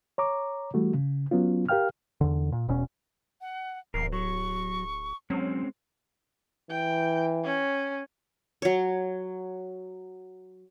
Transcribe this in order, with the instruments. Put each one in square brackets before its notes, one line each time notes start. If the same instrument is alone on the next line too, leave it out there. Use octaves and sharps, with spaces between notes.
[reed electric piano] C#5 A#5 D6
E3 G3 A3 F#4
C#3
F#3 B3 C#4 F4
G4 A#4 F5 G5 F6
[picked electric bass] E2 D3
A#2
E1 B2 C#4
[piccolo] F#5
[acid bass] D1 [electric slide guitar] E2 A#4 [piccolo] C7
[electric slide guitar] F#3 [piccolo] C#6
[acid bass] F#3 [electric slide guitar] G#3 C4 C#4
[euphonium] E3 [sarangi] G5
[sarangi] C#4
[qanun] F#3 C#5